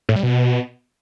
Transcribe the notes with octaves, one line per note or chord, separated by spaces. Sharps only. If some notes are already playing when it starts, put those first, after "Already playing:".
A2
G3
B2